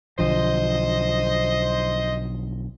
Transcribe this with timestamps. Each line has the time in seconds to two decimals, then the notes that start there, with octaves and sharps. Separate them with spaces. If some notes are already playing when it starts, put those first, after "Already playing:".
0.19 B1 D3 F3 C5 D#5